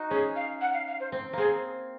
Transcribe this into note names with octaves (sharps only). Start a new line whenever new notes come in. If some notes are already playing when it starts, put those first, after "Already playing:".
Already playing: D#4 F#4
C#4 G#4
F5
F#5
F5
F5
C5
C4
A#3 C4 G#4